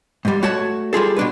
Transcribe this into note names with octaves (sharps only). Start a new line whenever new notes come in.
G#2 G3
A3 F#4 C#5 A5
G3 F4 G#4 A4
B2 D4 B4